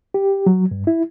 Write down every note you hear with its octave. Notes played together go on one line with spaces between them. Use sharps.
G4
F#3
G2
E4